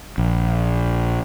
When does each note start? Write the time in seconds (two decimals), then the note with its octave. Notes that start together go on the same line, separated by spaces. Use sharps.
0.18 A#1